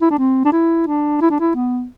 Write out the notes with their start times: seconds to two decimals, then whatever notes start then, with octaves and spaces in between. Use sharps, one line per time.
0.01 E4
0.10 D4
0.18 C4
0.45 D4
0.52 E4
0.87 D4
1.21 E4
1.30 D4
1.40 E4
1.55 B3